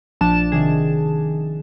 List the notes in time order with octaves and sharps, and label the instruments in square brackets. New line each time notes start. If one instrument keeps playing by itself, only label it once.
[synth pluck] A#1 F3 D4 A5 E7
C3 D#3 G#4